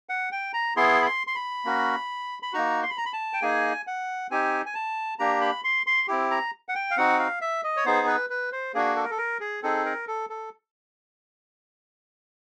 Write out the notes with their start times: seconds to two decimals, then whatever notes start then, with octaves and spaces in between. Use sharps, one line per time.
0.09 F#5
0.32 G5
0.54 A#5
0.76 B3 E4 G#4 C6
1.02 B5
1.06 C6
1.27 C6
1.35 B5
1.65 A#3 C#4 F#4
2.43 B5
2.53 A#3 D#4 F#4 A#5
2.83 C6
2.90 B5
2.97 A#5
3.06 B5
3.13 A5
3.33 G5
3.42 A#3 D#4 G#4 G#5
3.87 F#5
4.31 C4 D#4 G4 G#5
4.66 G#5
4.74 A5
5.19 A#3 D4 G4 A#5
5.41 B5
5.64 C6
5.86 C6
6.08 C4 E4 G4
6.31 A#5
6.69 F#5
6.75 G5
6.91 F5
6.97 C4 D#4 F#4 F#5
7.19 F5
7.41 E5
7.64 D#5
7.77 C#5
7.85 B3 D#4 G#4 C5
8.07 B4
8.30 B4
8.52 C5
8.74 A#3 D4 F#4 G#4
8.96 A4
9.04 A#4
9.11 A4
9.18 A#4
9.40 G#4
9.63 C4 D#4 G#4 A4
9.85 A#4
10.08 A4
10.30 A4